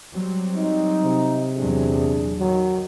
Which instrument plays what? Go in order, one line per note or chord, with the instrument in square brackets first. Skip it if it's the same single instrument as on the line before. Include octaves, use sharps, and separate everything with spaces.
[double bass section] F#3 G3 C4
[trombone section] D#4
[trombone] C3
[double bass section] E2 A#2 F#3 [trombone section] D4 G#4
[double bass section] D#3 [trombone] F#3